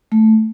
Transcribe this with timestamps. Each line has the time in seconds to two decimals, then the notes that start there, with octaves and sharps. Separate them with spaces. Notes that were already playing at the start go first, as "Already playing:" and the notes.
0.12 A3